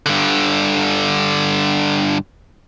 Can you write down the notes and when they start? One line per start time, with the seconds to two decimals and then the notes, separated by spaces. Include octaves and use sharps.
0.06 G2 D3